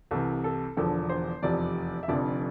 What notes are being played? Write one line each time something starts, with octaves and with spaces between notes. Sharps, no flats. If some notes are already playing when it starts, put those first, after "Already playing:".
C2 C3 E3 A4
A4
E1 E2 D3 F3 A4
C5
F1 E2 C3 F3 D5
E5
F1 F2 D3 F3 D5